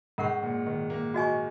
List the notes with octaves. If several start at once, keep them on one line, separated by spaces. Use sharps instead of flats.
G#2 C#4 A#4 F#5 C#6
A#2
D#3
A#3
F#4 D#5 G#5 C#6